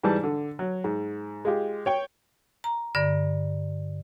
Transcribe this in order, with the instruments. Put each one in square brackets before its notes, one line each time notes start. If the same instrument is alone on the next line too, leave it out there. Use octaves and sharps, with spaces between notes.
[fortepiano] G#2 E3 G3 A5
D3
F#3
G#2
G#3 F4 G4
C#5 G5
[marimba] A#5
G2 D3 D5